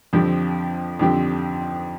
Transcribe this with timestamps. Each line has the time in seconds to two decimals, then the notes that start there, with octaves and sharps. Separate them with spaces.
0.13 F2 D3 F3 C4 G4
0.99 F2 D3 F3 C4 G4